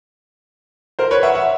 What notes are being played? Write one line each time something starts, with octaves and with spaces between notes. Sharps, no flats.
A#4 C5
B4 C#5
E5 F#5
E5 F#5